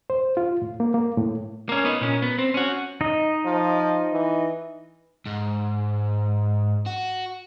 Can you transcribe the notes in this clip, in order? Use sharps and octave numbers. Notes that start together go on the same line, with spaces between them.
C5
F4
A2
A#3
A#3
A2
A#3 C#4
B3 D#4
A#2 C#4
B3
C4
C#4 F#4
D#4 D#5
F3
E3
G#2
F#4